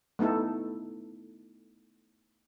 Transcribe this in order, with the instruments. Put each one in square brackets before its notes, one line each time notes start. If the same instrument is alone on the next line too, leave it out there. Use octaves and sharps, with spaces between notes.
[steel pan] A3 B3 D#4 E4 A4